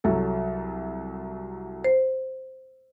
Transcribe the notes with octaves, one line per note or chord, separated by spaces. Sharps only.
C2 F#3 A4
C5